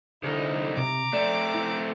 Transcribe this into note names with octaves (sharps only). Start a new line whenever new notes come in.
C2 D3 D#4 E4 A4
C3 A#5 D6
A3 C4 D5
E4